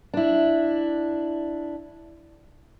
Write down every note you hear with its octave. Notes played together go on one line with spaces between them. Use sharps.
D4 E4